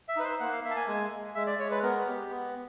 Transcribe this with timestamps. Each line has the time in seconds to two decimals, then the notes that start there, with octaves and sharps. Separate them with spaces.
0.08 E5
0.16 D#4 B4
0.24 C5
0.40 A#3 F#5
0.52 F5
0.64 A#3 E5
0.70 A5
0.76 G#5
0.87 G#3 G#5
1.11 G#3
1.35 G#3 E5
1.47 D5
1.58 G#3 C#5
1.71 B4
1.83 B3 A#4
2.07 G4
2.29 B3